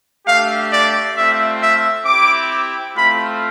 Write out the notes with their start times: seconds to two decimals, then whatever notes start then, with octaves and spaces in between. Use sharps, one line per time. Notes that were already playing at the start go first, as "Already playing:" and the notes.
0.25 A3 D4 G4 F5
0.70 D5
1.15 A3 C4 F4 E5
1.60 E5
2.04 C4 E4 G4 D6
2.94 A3 C4 F4 B5